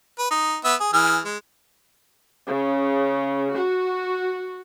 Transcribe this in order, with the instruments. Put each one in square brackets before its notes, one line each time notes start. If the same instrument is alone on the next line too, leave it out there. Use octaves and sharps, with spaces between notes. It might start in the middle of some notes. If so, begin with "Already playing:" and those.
[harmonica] B4
D#4
B3 E5
G#4
E3 G#4 F6
G#3
[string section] C#3
F#4